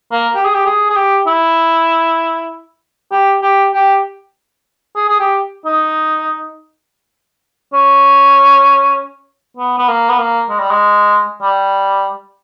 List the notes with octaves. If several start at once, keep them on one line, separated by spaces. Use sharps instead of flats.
A#3
G4
G#4
G4
G#4
G#4
G4
E4
G4
G4
G4
G#4
G#4
G4
D#4
C#4
B3
B3
A#3
B3
A#3
G#3
G3
G#3
G3